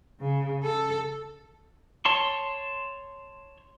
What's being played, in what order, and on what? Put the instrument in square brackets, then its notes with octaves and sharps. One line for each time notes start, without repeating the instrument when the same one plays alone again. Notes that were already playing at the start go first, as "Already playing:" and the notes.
[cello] C#3
A4
[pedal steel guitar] C#5 A5 C6 C#6